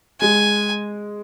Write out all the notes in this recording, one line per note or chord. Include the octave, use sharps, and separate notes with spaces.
G#3 G#5